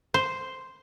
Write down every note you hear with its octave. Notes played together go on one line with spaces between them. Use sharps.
C5